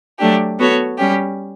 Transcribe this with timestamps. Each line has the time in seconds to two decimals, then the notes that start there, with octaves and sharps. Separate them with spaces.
0.20 F#3 A3 D4 G4
0.59 B3 F#4 A4 C#5
0.98 G3 C#4 G4